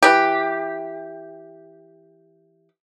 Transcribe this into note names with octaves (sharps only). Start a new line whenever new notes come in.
E3 G4